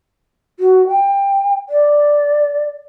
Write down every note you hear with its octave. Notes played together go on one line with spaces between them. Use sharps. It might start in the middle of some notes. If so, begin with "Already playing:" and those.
F#4
G5
D5